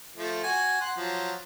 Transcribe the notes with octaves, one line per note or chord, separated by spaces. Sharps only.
F3 A3
F#4 G#5
F#5 C6
F3 F#3